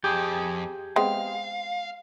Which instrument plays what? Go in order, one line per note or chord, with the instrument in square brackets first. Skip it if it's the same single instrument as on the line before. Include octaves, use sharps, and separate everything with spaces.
[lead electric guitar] F2 [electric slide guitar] G4 G#4
[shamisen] G#3 B3 C4 [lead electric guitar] F5